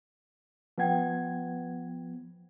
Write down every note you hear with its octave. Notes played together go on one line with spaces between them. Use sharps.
F3 B3 B4 F#5 G5 G#6